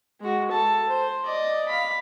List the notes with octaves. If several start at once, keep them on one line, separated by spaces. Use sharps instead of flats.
G#3 F#4
A4 A5
C5
D5 D#5
F5 B5